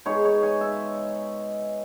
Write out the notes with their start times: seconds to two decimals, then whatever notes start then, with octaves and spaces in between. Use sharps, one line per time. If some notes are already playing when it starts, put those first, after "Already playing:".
0.05 B2 G#3 D#4 C#5
0.25 C#5
0.43 G#5
0.61 E5